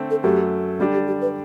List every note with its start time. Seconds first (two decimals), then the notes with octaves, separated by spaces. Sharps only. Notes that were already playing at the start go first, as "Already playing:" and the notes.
Already playing: D3 A3 C4
0.11 A4
0.24 F#2 F#3 A3 G4
0.79 D3 G3 D4 F#4
0.93 G4
1.07 G4
1.22 B4